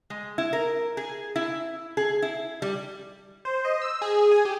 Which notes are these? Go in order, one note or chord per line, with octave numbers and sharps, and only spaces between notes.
G#3
E4
A#4
G#4
E4
G#4
E4
G3
C5
D#5
E6
G#4
G#5
G4